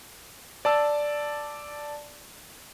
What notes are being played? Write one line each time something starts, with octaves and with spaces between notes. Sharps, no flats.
D5 A5 E6